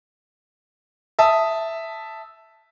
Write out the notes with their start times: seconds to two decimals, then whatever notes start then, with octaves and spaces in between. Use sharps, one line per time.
1.19 E5 A5 D#6